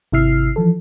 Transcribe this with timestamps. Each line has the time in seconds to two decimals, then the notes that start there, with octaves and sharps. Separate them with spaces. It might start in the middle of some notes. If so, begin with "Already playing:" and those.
0.12 G#1 C3 E4 E6 F6 C7
0.56 E3 F3 A4